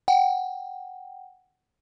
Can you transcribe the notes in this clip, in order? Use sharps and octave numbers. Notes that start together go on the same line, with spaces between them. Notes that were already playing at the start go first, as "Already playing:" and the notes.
F#5 G5